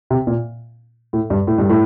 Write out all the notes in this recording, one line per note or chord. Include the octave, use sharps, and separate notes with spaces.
C3
A#2
A2
G2
A2
G2
A2